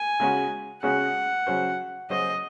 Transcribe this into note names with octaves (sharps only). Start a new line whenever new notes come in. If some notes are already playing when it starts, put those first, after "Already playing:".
Already playing: G#5
C#3 G#3 C#4 F#4
C#3 G#3 C#4 F#4 F#5
C#3 F#3 C#4 F#4 C5
C#3 F#3 C#4 F#4 C5 D#5